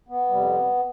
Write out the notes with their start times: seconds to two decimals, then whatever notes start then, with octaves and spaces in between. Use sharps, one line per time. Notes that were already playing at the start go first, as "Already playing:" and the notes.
0.09 B3
0.29 F2 C3 G3